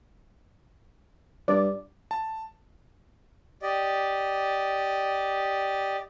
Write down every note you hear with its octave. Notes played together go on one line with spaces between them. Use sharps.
G2 D5
A5
G4 D5 D#5